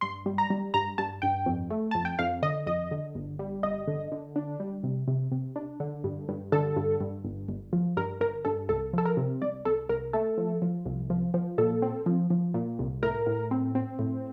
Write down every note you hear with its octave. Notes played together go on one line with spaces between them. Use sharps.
G2 C6
G3
A#5
G3
G2 A#5
G2 A5
G2 G5
F2
A3
F2 A5
G5
F2 F5
D3 D#5
F2 D#5
D3
G1
G3
G1 D#5
D3
D3
D4
G3
C3
C3
C3
D4
D3
G2
G2
D3 A4
G2
G2
G1
G1
F3
G2 A#4
G1 A#4
G2 A4
C2 A4
F3 A4
A#4
C3
C2 D5
C2 A4
C2 A#4
A3 A4
F3
F3
C2
F3
F3
A#2 A4
C4
F3
F3
A#2
C2
A2 A#4
A2
C4
C4
A2